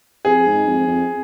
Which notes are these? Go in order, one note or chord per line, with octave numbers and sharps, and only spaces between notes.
F2 G#4
G#2
F2
F2